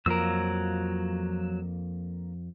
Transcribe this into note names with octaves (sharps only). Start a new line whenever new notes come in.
F2 F3 F#3 A#3 A#4 E6